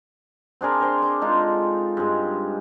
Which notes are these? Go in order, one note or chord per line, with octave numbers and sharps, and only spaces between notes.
C4 D4 G#4 A#4
A#4 C5 C6
D6
G#3 D#4 F4 A4
G2 G#3